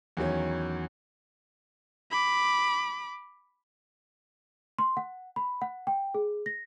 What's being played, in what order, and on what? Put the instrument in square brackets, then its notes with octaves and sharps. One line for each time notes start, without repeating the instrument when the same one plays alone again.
[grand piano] E2 D#3 F#3 C#4
[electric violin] B5 D6
[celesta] C6
F#5
B5
F#5
G5
G#4
A#6